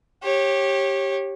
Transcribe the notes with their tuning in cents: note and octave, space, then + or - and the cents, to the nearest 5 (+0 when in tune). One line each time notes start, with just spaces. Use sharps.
G4 +0 C#5 -25